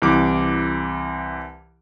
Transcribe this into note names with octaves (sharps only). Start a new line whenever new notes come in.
C2 E3 D6